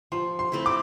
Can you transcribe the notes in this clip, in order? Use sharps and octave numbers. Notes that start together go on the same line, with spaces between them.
F3 C6
C6
A3 C4 E4
D6